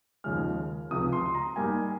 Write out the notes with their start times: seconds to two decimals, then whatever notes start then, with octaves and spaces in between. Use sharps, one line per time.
0.24 D#2 C#3 F3 G#3 F6
0.90 C#2 C3 F3 G#3 D#6
1.13 C6
1.35 A#5
1.56 G#2 G3 A#3 G#5